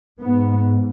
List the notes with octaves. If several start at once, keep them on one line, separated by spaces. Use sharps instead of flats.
G#2 B3